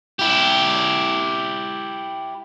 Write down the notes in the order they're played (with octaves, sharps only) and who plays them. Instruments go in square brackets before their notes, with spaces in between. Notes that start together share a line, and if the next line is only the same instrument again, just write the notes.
[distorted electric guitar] E4 G4